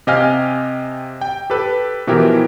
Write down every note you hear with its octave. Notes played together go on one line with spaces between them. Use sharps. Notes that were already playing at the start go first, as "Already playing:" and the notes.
C3 G4 D#5 F5 G#5 F6
G5
G4 A4 B4
B2 E3 F3 E4 G4 A#4